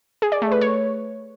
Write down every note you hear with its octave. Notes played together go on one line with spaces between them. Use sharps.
G#4
D5
A3
B4
C#5